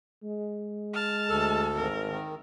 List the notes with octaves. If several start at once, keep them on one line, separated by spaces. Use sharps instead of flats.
G#3
A5 F6
D2 A4
G#1 A#4
D#3